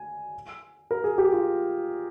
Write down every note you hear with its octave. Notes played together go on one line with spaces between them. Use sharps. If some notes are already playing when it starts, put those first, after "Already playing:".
Already playing: G#5
A#4
G#4
G4
F4